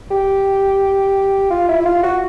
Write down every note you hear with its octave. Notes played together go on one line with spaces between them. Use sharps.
G4
F4
E4
E4
F4
F#4